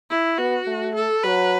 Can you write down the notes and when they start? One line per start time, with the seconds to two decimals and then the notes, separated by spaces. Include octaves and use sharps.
0.10 E4
0.39 B3 F#4
0.67 A3
0.95 A4
1.24 F#3 B4